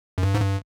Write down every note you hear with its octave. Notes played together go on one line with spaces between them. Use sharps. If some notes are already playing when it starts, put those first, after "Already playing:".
F#2
G2
G#2
G2